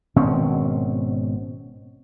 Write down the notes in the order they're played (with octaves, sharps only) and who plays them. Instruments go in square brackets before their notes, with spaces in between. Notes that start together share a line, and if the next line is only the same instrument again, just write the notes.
[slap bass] G#1 B2 C4 C#4